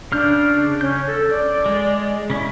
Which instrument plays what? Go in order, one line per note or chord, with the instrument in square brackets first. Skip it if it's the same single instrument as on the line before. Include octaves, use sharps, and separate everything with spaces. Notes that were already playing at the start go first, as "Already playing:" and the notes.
[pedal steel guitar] C#3 F6 G6 [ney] D4
[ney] C#4 [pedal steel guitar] G6
[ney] A4
D5
[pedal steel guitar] G#3
C#3 C#4 E4